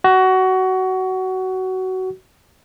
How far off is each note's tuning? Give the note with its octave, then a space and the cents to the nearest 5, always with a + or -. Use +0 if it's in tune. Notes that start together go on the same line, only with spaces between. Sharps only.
F#4 +20